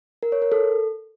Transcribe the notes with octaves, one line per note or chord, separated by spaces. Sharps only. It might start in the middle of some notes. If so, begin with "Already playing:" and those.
A#4
C#5
A#4
A4